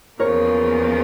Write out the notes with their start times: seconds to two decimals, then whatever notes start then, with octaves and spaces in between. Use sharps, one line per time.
0.19 E2 C#3 F3 A#3 A#4 C#5